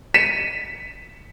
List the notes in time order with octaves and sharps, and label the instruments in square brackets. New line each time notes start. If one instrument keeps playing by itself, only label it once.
[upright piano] B6 C#7 D#7 E7